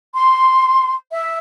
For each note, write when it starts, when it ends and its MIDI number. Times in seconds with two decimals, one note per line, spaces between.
0.15 0.93 84
1.11 1.38 76